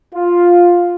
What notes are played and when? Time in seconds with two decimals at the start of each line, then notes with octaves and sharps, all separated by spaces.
0.14 F4